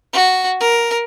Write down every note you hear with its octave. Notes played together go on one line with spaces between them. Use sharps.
F#4
A#4